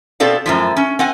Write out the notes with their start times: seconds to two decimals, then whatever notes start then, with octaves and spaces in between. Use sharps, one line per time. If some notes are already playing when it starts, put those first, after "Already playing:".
0.20 B2 C4 A4 D5 F5
0.46 F#2 A2 F3
0.77 C#4
0.99 C4 F#5 G#5